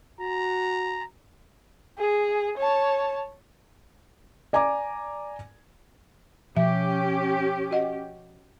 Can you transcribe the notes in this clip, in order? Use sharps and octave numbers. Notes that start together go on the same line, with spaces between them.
F#4 A#5
G#4
C#5 A5
D5 G#5 A#5 D6
B2 F3 C#4 G4 E5
F#4 D#5 F#5